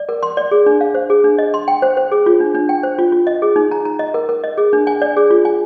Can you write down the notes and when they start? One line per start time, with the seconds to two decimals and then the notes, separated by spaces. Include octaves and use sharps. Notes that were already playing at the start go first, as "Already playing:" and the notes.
Already playing: D5
0.09 A#4
0.23 C6
0.37 D5
0.51 G#4
0.66 D4
0.81 F5
0.95 C5
1.10 G#4
1.24 D4
1.39 D#5
1.54 C6
1.68 G5
1.82 C5
1.97 C5
2.12 G#4
2.26 F4
2.40 D4
2.55 D4
2.69 G5
2.83 C5
2.99 F4
3.12 F4
3.27 D#5
3.42 G#4
3.56 D#4
3.71 A#5
3.85 A#5
3.99 D#5
4.14 A#4
4.29 A#4
4.44 D#5
4.58 G#4
4.73 D4
4.87 G#5
5.02 D5
5.17 G#4
5.31 F4
5.45 G#5